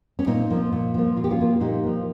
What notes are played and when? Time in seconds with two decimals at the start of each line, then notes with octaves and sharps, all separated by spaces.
0.19 C#4
0.27 A#2 C4 D#4
0.50 F3 A#3
0.72 A#2
0.94 F3 A#3
1.17 A#2 F4
1.24 G4
1.30 C#4 F4
1.39 F3 A#3
1.61 A#2 D#4 G4
1.83 F3 A#3